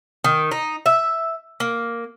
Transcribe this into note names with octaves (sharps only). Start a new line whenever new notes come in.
D#3
D#4
E5
A#3